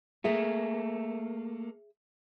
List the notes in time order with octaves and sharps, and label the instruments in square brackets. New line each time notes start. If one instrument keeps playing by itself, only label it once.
[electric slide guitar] A3 A#3 [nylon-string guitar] G#4 E5